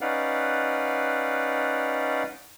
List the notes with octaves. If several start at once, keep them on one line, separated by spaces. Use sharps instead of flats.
C#4 D#4 B4 D5 F5 F#5